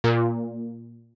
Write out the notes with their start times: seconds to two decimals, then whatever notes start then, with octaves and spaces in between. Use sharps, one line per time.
0.04 A#2